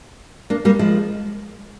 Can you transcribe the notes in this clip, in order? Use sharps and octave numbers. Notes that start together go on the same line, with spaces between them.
A#3 D4
G3 A#3
F3 G#3